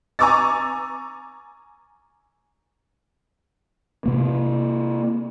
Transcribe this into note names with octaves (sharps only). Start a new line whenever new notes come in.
G#5 A#5 C#6 D6 E6 A6
C3 A#3